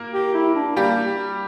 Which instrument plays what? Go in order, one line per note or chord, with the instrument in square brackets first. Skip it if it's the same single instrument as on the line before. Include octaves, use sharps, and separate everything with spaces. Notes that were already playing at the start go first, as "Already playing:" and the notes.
Already playing: [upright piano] A#3 A#4
[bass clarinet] G4
E4
D4
[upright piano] G3 G4 [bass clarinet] A#3